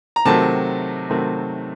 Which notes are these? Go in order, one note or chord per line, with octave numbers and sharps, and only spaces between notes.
A#5
C3 D#3 F#3 A3 C4 A5
C3 D#3 F#3 A3 C4